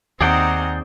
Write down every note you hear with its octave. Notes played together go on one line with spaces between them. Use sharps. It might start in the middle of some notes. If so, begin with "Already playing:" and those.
D#2 C4 D#4 G#4 D5 F#5 G5 A#5